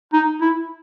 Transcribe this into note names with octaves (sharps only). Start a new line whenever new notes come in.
D#4
E4